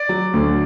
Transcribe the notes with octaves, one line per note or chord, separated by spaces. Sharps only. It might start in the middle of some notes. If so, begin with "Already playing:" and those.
Already playing: D5
F#3
D2